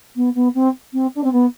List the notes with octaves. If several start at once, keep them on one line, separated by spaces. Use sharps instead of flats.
B3
B3
C4
C4
D4
C4
B3